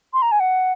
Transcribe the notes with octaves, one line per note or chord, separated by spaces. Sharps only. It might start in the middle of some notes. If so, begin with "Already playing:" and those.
C6
A#5
G#5
F#5